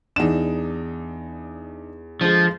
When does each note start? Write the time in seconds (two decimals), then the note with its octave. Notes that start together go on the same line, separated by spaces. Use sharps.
0.16 E2 D4 D#4 E7
2.21 D3 F3 G#3